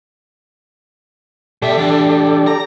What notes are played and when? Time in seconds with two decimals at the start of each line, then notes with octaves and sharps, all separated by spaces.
1.62 B2 G4 A4 D5 E5
1.78 E3 D4
2.47 A#5